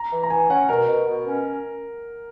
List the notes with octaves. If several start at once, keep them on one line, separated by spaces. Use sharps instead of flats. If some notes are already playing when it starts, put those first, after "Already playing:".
Already playing: A#5
E3
A#5
E3 G#5
C#4 F#5
B2 A#4
B2
B2
C#4